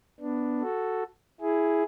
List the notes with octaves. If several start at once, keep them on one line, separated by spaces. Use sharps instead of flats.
B3 D4
F#4 A4
E4 G#4